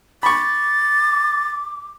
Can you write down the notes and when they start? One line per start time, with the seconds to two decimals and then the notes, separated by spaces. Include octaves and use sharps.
0.23 B5 C#6 D6 A6